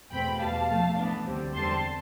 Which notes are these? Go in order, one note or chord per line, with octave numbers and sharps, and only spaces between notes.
E2 B2 A3 C4 G5 B5
E2 B2 G3 F5 A5
C3 F3 A3
A2 E3 B3 D4
D2 D3 G3 C4
E2 D3 G3 C4 A5 C6